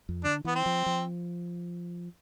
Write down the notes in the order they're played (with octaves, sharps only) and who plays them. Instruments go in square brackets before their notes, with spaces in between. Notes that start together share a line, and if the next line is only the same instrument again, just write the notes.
[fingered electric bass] F2
[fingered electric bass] D3 [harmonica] D4
[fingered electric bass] E3 [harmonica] B3
[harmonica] C4
[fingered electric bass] F3
F3